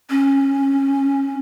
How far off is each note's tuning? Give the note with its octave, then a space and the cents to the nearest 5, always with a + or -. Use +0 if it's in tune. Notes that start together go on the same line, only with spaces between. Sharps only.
C#4 -15